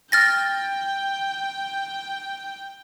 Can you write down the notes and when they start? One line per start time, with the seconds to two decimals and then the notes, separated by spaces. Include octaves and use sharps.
0.12 G5 F6 A6 A#6